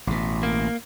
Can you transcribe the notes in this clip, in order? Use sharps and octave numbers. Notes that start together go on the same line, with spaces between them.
A1 B2
A#3